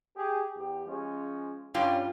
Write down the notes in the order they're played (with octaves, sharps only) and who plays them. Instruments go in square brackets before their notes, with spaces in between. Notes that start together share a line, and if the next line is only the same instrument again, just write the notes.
[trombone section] G4 G#4
E2 G4
F3 G#3 C#4
[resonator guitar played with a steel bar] G2 G3 F4 [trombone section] C#4